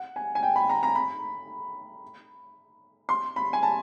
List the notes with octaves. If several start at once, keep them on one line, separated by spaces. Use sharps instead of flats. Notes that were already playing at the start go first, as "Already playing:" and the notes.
Already playing: F#5
G#5
G#5
G5
B5
A#5
A#5
B5
C6
B5
G#5
A5